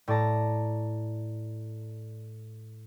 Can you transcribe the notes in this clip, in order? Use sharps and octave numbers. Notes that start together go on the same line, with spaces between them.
A2 D5 A5 A#5